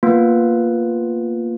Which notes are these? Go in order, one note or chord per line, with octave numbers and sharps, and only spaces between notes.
A#3 B3 F4 B4